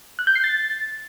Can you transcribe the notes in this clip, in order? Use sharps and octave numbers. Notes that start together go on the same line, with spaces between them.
F#6
G6
C7
A6